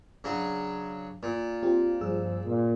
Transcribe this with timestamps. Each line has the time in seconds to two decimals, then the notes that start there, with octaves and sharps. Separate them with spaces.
0.24 C#3 F#3 D4
1.23 A#2
1.63 C4 F4 G4
2.01 G2 F3 G#4 E6
2.45 A#2